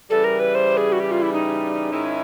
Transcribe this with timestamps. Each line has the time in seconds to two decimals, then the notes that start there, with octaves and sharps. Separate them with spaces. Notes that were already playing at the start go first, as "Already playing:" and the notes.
0.10 C#3 E3 G3 A4
0.24 A#4
0.39 B4
0.55 C5
0.77 G#4
0.92 F#4
1.00 G4
1.11 F4
1.22 E4
1.33 D#4
1.89 G#2 D#3 G#3 C#4 E4